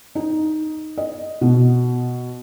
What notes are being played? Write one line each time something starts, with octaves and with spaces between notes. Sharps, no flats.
D#4
D#5
B2